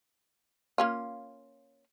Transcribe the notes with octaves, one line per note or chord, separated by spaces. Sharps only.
A#3 C#4 F4